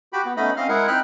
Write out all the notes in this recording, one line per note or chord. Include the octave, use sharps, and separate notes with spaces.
F#4 G4 G5 B5
B3
A3 B3 C#4 D#4 D#5 B5
C4 C#4 D#5 F5 F6
G#3 E4 G#4 A#4 F#5
C4 D#4 G5 B5 F6 F#6